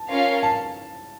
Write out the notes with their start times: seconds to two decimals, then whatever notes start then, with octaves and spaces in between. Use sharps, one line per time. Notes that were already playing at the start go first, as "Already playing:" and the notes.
Already playing: A5
0.09 C#4 F4 A#4 C#5 F5
0.43 A5